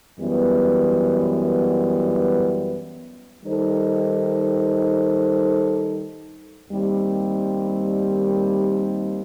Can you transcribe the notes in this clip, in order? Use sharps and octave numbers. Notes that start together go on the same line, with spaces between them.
F#2 E3 G3 B3
D#3 G3 D#4 A4 C5
D#2 D#3 G3 C4